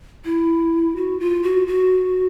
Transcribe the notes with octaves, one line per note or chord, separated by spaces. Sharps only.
E4
F#4
F4
F#4
F#4